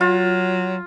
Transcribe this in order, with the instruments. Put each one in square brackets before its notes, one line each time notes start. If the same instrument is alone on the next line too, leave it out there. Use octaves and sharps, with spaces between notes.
[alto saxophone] F#3 [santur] F4